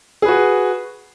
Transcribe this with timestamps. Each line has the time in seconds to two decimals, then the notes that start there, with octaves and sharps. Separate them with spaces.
0.22 G#4
0.25 B4
0.28 F#4